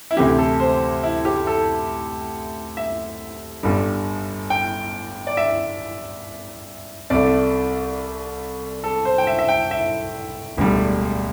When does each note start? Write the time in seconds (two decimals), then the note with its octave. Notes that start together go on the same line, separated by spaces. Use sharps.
0.11 E4
0.17 D2 C3 E3 A3 G4
0.38 A4
0.60 C5
1.03 E4
1.25 G4
1.47 A4
2.77 E5
3.63 G1 G2 D3 G3
4.50 G5
5.27 D5
5.37 E5
7.10 C2 C3 A3 D5
8.84 A4
9.05 C5
9.18 G5
9.27 E5
9.39 E5
9.49 G5
9.71 E5
10.57 E1 D2 D3 G3